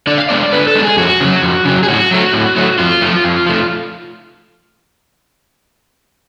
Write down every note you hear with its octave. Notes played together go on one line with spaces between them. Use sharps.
D3 D5
F5
G#3 B3 D4 D5
D3 B4
A4
G#3 B3 D4
G#4
F2 F#4
C#3 F#3
F2
C#3 F#3
G#4
A2 F#4
F#3 A3
A2
F#3 A3
F2 F4
F3 A3
F2
F3 A3